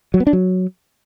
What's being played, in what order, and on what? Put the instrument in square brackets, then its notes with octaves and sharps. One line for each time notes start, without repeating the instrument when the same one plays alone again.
[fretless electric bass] F#3
B3
D4
F#3